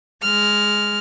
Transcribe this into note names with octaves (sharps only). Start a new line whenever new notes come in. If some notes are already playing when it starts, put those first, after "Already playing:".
G#3 F6